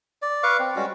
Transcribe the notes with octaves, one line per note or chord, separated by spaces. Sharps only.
D5
B4 F5 C#6 D6
C4
G3 G#3 C#4 F#4